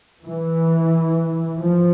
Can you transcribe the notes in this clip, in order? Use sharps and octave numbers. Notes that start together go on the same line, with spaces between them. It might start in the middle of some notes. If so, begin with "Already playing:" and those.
E3
F3